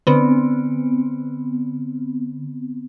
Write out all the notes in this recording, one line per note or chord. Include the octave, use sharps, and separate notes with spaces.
D3 B3 C4